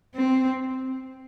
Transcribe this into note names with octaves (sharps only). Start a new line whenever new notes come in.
C4